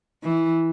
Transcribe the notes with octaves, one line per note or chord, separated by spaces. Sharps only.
E3